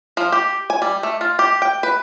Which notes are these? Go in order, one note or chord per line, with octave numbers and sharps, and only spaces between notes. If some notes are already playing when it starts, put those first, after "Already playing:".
F3
G4
G#5
G3
A3
F4
G4
G5
B4